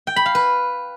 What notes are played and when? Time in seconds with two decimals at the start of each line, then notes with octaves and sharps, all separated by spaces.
0.07 G5
0.16 B5
0.26 F5
0.35 B4